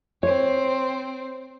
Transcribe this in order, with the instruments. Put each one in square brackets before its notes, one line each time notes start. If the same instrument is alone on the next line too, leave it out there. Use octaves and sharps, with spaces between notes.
[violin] C4 C5 [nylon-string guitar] C#5